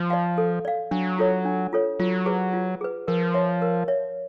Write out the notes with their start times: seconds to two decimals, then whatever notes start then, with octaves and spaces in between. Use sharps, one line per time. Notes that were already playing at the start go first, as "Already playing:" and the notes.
Already playing: F3
0.10 D5 F5
0.38 A4
0.65 D5 F5
0.91 F#3 D4
1.18 F4 A4 C#5
1.45 D4
1.73 F4 A4 C#5
2.00 F#3 F4
2.26 G#4 B4
2.53 F4
2.81 G#4 B4
3.08 F3 A#4
3.34 C#5 E5
3.62 A#4
3.88 C#5 E5